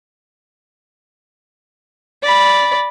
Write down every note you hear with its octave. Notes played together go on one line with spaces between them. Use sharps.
D5 B5